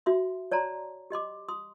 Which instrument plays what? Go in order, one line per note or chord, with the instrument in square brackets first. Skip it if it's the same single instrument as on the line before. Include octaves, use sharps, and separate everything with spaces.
[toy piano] F#4 E5 C6
C#5 D5 A5 A#5 C6
G4 D#5 C6 D6
C6 D#6